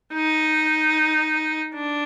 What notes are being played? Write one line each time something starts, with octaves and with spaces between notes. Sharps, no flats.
D#4
D4